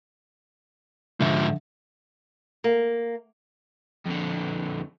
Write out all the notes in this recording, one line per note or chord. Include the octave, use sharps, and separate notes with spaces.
G#2 D3 F3 E5
A#3
F2 D3